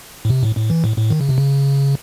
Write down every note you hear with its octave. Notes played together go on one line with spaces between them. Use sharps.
A2
C3
A2
A2
E3
A2
A2
D#3
C#3
C3
C#3